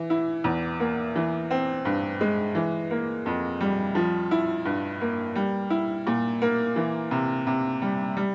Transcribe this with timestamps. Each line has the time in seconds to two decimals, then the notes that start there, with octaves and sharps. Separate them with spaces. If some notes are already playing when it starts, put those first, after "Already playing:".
Already playing: E3
0.10 E4
0.44 E2
0.80 A#3
1.15 E3
1.51 C4
1.85 G2
2.21 G#3
2.55 E3
2.91 A#3
3.26 F2
3.61 G3
3.95 F3
4.31 E4
4.65 G2
5.01 A#3
5.35 G3
5.70 E4
6.07 A#2
6.42 A#3
6.76 E3
7.11 C3
7.47 C3
7.82 G3
8.17 G3